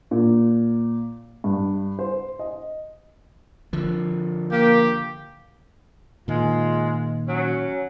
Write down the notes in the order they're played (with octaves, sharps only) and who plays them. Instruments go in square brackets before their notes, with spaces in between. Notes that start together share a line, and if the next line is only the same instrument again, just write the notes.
[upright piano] A#2
G2
C5
D#5
[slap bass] D3 F3
[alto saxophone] A#3 [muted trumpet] G4
[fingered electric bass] A#2 D#3 [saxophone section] G#3 F4
[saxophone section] F#3 C#4